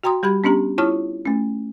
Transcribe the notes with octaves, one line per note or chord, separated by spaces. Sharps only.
F#4 G5 A#5 C6 D#6
G3 G4 B5 G#6
B3 C#4 D4 G4 A#5
E4 F4 C#5 A5 C#6 F6
A3 C#4